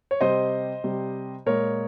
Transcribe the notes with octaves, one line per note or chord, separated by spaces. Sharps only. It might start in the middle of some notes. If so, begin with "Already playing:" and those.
C#5
C3 G3 C5 D#5
C3 G3
A#2 G#3 A#4 C#5